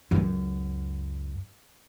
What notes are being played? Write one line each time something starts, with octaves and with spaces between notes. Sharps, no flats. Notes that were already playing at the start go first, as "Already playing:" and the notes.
C#2 F#2